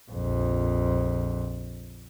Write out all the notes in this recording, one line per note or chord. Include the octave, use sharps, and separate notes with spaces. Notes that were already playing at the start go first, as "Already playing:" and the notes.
A#1 F2